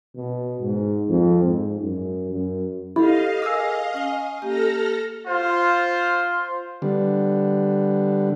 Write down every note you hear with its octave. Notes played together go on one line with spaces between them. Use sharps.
B2
G#2
F2
G#2
F#2
F#2
E4 G4 A4 D#5 F5
G#4 A#4 G#5 D6 E6
C#4 G#5
A#3 G4 A4 F6 A#6
F4 C5
D3 G3 B3